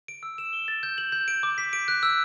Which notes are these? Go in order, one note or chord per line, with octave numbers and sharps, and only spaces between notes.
D7
E6
E7
G7
A6
G6
F#7
G6
D7
D6
B6
D7
F#6
E6